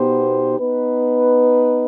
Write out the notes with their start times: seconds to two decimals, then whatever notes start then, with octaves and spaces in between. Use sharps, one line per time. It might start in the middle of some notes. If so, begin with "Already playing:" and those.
Already playing: B2 B3 D#4 G4 C5
0.58 B3 D#4 B4